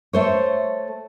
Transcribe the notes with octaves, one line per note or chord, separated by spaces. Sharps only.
A3 C5 C#5